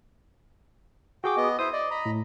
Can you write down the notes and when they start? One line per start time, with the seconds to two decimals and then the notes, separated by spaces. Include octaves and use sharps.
1.24 F#4 G#4 G5 D6
1.37 B3 D#5
1.59 E4 C5 D#6
1.73 D5 D#5
1.91 D#5 A#5 B5
2.06 A2